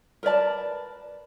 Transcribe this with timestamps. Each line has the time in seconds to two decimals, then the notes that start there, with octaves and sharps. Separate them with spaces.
0.23 A#4 B4 D5 A5